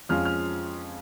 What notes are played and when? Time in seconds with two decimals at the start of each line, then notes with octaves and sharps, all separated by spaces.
0.09 F2 F3 G#3 C#4 F4 F6
0.25 F6